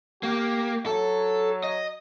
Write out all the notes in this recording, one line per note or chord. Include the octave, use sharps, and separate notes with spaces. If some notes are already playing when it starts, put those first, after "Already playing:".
A#3 G4
F#3 A4
D#5